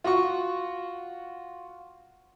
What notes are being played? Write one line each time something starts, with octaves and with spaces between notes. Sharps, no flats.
F4 F#4 F#5 C#6